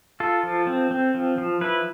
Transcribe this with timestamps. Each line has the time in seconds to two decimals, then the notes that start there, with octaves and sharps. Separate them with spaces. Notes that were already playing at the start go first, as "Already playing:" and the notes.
0.20 F4 A4
0.43 F3
0.67 C4
0.91 C4
1.14 F3
1.38 F3
1.61 E4 B4